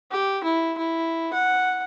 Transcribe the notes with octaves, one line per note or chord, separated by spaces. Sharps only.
G4
E4
E4
F#5